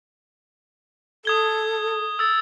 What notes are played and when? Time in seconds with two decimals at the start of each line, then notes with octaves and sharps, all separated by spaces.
1.25 A4 D#6 G#6 G7
2.19 E6 A6